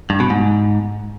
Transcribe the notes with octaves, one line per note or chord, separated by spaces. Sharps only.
G2
B2
G#2